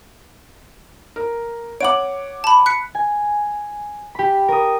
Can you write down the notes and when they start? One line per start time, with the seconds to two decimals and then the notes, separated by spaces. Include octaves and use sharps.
1.16 A#4
1.81 C#5 F#5 D6 D7 F#7
2.44 A5 B5
2.66 F#6 B6 C#7
2.95 G#5
4.15 G4 B5
4.48 A#4 D#6